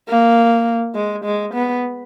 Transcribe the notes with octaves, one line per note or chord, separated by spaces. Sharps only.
A#3
G#3
G#3
B3